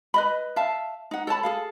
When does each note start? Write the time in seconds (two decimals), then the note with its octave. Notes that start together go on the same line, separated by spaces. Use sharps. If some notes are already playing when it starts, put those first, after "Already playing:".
0.14 B4 D#5 B5
0.56 E5 F5 A5
1.11 D#4 F#5
1.27 A4 C#5 A5 B5
1.43 G#4 A4 F5